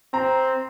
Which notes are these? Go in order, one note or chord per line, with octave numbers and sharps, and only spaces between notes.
C4 A#5